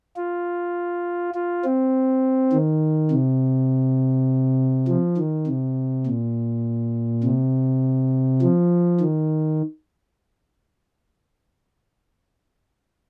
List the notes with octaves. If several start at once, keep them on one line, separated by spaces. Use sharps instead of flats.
F4
F4
C4
D#3
C3
F3
D#3
C3
A#2
C3
F3
D#3